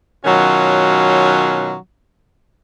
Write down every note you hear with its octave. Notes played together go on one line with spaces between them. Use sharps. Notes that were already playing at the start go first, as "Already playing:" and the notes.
B2 D#3 F#3 C#4 F4